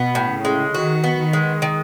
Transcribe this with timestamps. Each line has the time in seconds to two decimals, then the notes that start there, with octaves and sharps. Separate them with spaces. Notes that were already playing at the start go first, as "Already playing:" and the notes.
Already playing: B2 B3
0.15 A2
0.30 C#3
0.45 G#3
0.75 D#3 F#4
1.04 B3
1.19 D#3
1.33 G#3
1.62 D#3